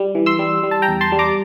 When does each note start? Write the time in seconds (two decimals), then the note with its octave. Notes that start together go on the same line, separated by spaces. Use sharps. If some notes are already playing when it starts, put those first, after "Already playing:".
Already playing: G3
0.15 E3
0.26 C6 E6
0.39 G3
0.63 G3
0.71 A5
0.82 G5 A#5
0.88 E2
1.01 A5 C6
1.12 G3
1.19 A#5 D6